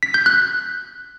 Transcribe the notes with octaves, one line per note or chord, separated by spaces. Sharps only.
B6
G6
F#6